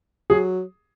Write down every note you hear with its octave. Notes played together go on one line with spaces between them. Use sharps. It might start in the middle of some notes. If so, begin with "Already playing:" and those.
F#3 G#4